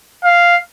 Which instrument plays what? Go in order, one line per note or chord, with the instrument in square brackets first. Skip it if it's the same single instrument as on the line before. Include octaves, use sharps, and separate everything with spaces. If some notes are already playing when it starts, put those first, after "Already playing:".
[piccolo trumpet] F5